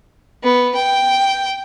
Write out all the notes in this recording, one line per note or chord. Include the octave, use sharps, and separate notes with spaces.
B3
G5